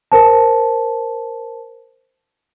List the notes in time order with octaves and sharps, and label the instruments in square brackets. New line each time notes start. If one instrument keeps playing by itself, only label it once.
[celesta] A#4 C5 A5